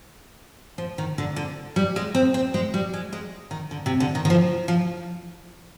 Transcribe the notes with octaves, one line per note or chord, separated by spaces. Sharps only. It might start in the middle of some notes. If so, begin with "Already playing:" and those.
F3
D#3
D3
D3
G3
G#3
C4
C4
G#3
G3
G#3
G#3
D#3
D3
C3
D3
D#3
D#3
F3
F3